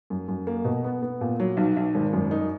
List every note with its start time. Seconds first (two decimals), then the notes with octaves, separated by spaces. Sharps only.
0.10 F#2
0.28 F#2
0.47 A#3
0.65 B2
0.84 B3
1.02 B3
1.21 A#2
1.40 F#3
1.57 B1
1.77 B1
1.95 G#1
2.13 F#2
2.31 D#4